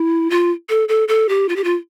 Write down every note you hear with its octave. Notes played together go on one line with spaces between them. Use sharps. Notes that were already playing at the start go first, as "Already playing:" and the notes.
Already playing: E4
F4
A4
A4
A4
G4
F4
G4
F4